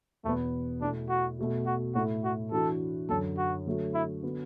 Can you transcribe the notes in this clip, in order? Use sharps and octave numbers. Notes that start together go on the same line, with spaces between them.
E2 B2 A3 B3
B2 A3 D4 E4
F#4
B2 A3 F#4
F#4
A2 A3 E4 F#4
F#4
E3 D4 F#4 A4
F#2 D3 F#3 A4
F#4
D3 F#3 A3 F#4
E4
D3 B3 F#4